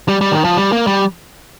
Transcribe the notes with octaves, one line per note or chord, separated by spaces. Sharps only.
G3
G3
D#3
F3
G3
A#3
G3